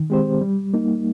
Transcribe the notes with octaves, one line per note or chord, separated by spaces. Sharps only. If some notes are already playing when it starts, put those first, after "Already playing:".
Already playing: D#3
G#3 C4 G4 C5
G3
A#3 D#4